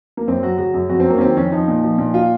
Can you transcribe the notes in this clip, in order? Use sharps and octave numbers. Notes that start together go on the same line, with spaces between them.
A#3
F#2 C4
F#3 F#4
C#3 F#4
F#2
F2 F#4
C4
F#3 A#3
C#4
D#3 C4
F2 C#4
F3 D#4
A#2
F3
A#2
F4